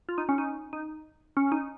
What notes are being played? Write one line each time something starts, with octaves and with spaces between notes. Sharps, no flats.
F4
D#4
C#4
D#4
D#4
C#4
D#4